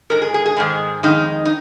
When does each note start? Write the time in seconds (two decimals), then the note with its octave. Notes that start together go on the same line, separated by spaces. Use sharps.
0.10 G#2 G#3 A#4
0.22 G#4
0.34 G#4
0.46 G#4
0.56 G#2 D#3 G#3
1.03 F2 D#3 G#3 D#4
1.45 D#4